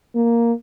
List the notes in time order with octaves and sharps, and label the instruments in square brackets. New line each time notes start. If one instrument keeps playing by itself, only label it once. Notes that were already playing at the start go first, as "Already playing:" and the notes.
[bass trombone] A#3